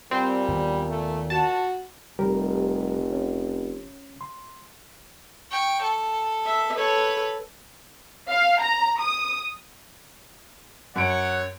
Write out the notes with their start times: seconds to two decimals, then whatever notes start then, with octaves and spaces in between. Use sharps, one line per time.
0.11 A#2 G3 C4
0.48 D#2 B3
0.90 A3
1.30 F#4 A5
2.19 F1 G3 G4 A#4
3.11 C#4
4.21 C6
5.51 G5 C#6
5.82 A4
6.45 E5
6.76 A4 B4 C#5
8.29 F5
8.61 A#5
9.00 D#6
10.96 F#2 C#5 F#5 D7